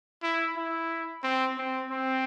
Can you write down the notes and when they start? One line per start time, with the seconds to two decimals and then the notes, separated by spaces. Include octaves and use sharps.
0.23 E4
0.57 E4
1.23 C4
1.58 C4
1.91 C4